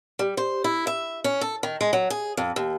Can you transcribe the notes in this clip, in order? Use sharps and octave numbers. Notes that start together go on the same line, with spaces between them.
G3
C5
E4
E5
C#4
A4
D#3
G#3
F#3
G#4
F2
D#2